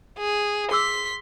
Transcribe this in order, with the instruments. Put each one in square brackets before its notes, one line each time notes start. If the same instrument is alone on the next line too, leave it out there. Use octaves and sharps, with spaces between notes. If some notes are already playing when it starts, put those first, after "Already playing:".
[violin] G#4
[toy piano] G#4 D6 E6 [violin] C6 B6